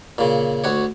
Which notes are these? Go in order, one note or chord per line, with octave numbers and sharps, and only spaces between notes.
A#2 C#3
D2 F#4 C#5